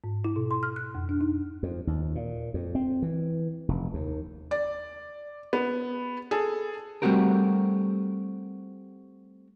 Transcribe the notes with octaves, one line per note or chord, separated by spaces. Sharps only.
G#2
E4
B2
C6
F6
F#6
F2
D4
D#4
F2
D#2
A#2
F2
C4
E3
F1
D#2
D5
B3
G#4 A4
G3 A3 C4 F#4 G4 A#4